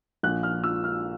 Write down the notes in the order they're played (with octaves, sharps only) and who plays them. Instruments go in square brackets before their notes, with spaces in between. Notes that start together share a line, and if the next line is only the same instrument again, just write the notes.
[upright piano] A#1 F#6
F6
F3 E6
F6